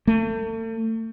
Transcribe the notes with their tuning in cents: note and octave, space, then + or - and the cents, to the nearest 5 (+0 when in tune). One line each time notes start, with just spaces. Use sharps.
A3 +35